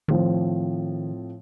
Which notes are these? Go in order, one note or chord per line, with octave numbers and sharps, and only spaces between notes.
A2 D#3 F3 C4